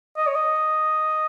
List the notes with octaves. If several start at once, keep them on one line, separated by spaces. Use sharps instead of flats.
D#5
C#5
D#5